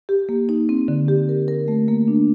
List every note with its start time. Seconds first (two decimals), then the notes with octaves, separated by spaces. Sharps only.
0.09 G4
0.29 A#3
0.49 D#4
0.69 C4
0.88 D3
1.08 G4
1.29 A#4
1.48 A#4
1.68 A3
1.88 A#3
2.08 D4